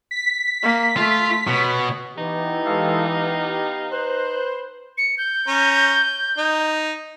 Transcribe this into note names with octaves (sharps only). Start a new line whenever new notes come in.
B6
A#3
A3 F4
B2 C#5
E3 B3 D#4 G4
G#3 A4 F5
F5
B4 C5 F#6
C#7
G6
C#4 A#5
D#4